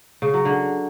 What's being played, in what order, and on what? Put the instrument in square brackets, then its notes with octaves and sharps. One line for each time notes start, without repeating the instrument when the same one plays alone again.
[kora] C#3
F#3
D3